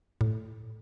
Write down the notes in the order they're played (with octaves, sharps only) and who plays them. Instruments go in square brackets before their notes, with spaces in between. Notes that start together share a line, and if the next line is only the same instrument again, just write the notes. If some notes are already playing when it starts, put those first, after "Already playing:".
[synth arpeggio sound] A2